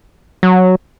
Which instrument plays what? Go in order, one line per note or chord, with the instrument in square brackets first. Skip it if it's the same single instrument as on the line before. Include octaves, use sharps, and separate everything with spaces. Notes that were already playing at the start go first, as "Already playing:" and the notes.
[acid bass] F#3